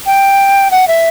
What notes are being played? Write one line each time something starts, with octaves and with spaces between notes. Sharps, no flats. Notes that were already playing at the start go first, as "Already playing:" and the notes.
G5
F#5
E5